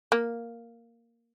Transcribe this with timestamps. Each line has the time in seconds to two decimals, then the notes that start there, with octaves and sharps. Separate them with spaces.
0.12 A#3